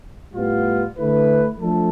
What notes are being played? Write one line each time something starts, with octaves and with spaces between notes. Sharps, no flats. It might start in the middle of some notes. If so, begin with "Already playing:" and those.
A2 G3 B3 F4
D3 A3 E4 B4
F3 A3 D4 A4